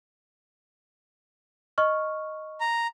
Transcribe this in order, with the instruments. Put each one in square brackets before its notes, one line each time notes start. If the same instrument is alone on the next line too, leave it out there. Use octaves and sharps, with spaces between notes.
[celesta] D#5 C#6 F6
[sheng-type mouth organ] A#5